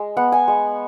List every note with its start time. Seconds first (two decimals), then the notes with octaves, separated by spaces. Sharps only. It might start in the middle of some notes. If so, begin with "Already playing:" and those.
Already playing: G#3
0.17 B3 F#5
0.32 G#5
0.48 G#3